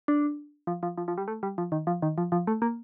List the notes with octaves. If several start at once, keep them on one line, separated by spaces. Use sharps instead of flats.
D4
F3
F3
F3
F3
G3
A3
G3
F3
D#3
F3
D#3
F3
F3
A3
A#3